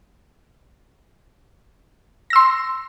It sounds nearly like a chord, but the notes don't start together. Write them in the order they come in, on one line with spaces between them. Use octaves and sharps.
A#6 E6 C6